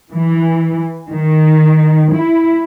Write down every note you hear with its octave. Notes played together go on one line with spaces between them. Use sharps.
E3
D#3
E4